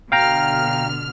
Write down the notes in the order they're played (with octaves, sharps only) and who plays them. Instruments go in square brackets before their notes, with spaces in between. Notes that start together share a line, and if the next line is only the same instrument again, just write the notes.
[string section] B2 D3 F6 [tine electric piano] F5 G5 A#5